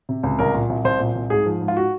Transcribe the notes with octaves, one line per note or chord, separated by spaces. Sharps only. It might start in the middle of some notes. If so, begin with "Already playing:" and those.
C3
C#2
C2 A#4
A#2
C2
C2 C5
A#2
C2
G#2 G#4
F3
G#2
F4
F#4